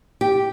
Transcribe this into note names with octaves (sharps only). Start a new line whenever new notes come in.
G4